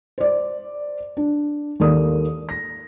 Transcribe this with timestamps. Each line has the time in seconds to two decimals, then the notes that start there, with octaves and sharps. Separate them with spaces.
0.18 C5 D5
1.17 D4
1.80 D#2 A#3 A4 D5 D#6
2.49 A#6